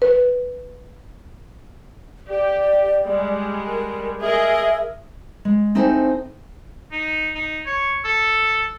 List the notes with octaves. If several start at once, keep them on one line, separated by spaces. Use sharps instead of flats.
B4
G4 D5
G3 G#3
A#4
G#4 A#4 D#5 E5
G#3
C4 D#4 E4 A4 C5 G#5
D#4
D#4
C#5
A4